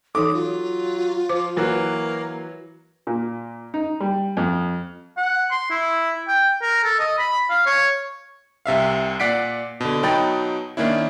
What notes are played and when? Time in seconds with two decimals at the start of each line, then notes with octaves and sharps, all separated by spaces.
0.15 E3 D#4 A4 D6 D#6
0.34 F#3 F4
1.29 F3 C5 D6
1.56 E3 F#3 A#3 F#4 B4
3.07 A#2
3.74 D#4
4.00 G3
4.37 F2
5.17 F#5
5.51 C6
5.70 E4
6.28 G5
6.62 A#4
6.84 A4
6.99 D#5
7.19 B5
7.50 F5
7.66 C#5
8.66 C2 C3 E5 F5
9.20 A#2 D5 F#5 B6 C7 D7
9.81 B2 D3
10.03 B2 F#3 D#4 G5 B5 A6
10.77 D#3 A#3 C#4 D4 E4